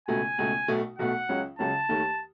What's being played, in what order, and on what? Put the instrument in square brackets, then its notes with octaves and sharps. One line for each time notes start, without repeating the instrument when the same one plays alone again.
[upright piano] C#2 B2 A3 [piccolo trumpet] G#5
[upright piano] C#2 B2 A3
B1 B2 A3
[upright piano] B1 B2 A3 [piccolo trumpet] F#5
[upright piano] C#2 C#3 F#3 C#4
[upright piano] C#2 C#3 F#3 C#4 [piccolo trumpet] A5
[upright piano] D#2 D#3 A3